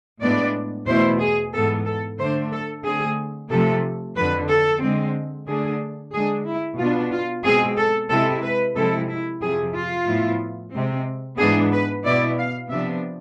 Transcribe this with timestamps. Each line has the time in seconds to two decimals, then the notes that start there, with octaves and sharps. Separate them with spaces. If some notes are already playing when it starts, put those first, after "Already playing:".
0.22 A2 G#3 B3 D4 D5
0.87 E2 B2 A3 E4 C5
1.20 G#4
1.53 G#2 E3 B3 A4
1.86 A4
2.18 D3 A3 D4 C5
2.52 A4
2.84 D3 A3 C4 G#4
3.50 C3 F3 A3 A4
4.16 F2 D3 F3 B4
4.49 A4
4.81 D3 G#3 C4
5.47 D3 A3 D4 G#4
6.13 D3 G#3 D4 G#4
6.46 E4
6.79 B2 B3 D4 F4
7.12 F4
7.44 B2 G#3 C4 G#4
7.78 A4
8.10 C3 G#3 C4 E4 A4
8.43 B4
8.75 C3 F3 G#3 C4 E4 A4
9.08 E4
9.42 F2 C3 F3 G#4
9.74 F4
10.07 A2 F3 B3 E4
10.73 C3 G#3 C4
11.39 G#2 E3 B3 D4 G#4
11.72 B4
12.04 B2 B3 E4 D5
12.37 F5
12.70 C3 F3 B3 D4 E5